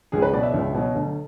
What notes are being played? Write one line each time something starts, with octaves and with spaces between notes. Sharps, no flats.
C#2 G#4
B4
B2 F#3 D5
E5
C#2
B2 F#3
D2